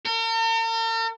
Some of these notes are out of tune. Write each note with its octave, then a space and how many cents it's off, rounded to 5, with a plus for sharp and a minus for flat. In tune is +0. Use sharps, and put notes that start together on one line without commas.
A#4 -45